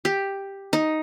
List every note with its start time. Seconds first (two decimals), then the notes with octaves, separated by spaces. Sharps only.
0.05 G4
0.73 D#4